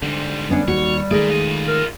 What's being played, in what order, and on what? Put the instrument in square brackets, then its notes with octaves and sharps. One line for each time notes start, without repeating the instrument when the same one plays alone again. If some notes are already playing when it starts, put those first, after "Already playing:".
[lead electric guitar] G#2 G3 [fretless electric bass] D3
[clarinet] G3 [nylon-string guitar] B3 C#4 D4
[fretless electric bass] D#2 [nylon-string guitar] F#4 [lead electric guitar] C#5
[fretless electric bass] D#3 G#3 A3 [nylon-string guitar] G#4 [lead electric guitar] A#4 D5
[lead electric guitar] F4 D#5
[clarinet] A#4